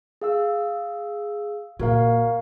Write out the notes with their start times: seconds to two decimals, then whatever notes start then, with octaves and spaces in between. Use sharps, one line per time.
0.22 G#4 F5 E6
1.79 A#2 F#4 A#4 F5